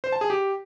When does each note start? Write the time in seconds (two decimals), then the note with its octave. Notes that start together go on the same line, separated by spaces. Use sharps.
0.04 C5
0.12 A5
0.21 G#4
0.30 G4